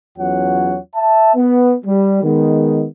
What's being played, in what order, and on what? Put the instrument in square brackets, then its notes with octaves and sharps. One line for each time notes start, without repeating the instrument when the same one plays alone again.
[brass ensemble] E2 F#3 C#4 F4 C#5 F#5
E5 A5
B3
G3
D#3 G#3 B3